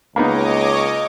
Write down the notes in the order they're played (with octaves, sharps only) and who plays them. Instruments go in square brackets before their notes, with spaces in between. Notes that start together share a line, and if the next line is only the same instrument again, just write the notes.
[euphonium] C#2 [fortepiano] A#3 B3 D#4 [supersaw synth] C#5 D#5 D6